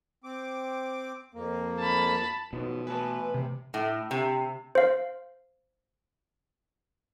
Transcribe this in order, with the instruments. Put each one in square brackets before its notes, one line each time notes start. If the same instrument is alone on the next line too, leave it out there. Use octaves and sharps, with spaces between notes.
[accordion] C4 D6
F2 A#3
[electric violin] A5 B5
[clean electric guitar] F#2 D#3 F3 [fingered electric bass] B2
[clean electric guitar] E3 A3 A5 [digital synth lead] B4 [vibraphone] G#5
[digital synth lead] C3
[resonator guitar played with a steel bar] A2
C3
[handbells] C5 F5